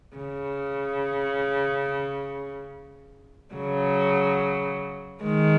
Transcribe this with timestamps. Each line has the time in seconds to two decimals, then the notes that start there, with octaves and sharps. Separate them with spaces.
0.17 C#3
3.55 C#3 F#3
5.23 D#3 G#3